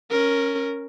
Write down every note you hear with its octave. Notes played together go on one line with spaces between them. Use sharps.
C#4 A#4